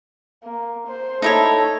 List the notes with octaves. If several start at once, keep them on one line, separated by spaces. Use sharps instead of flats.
A#3
C5
D#4 E4 A4 C#5